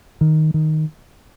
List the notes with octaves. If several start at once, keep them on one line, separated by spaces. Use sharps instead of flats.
D#3
D#3